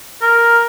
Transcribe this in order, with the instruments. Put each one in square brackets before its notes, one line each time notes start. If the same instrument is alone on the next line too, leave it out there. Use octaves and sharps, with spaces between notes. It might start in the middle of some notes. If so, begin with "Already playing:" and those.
[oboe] A#4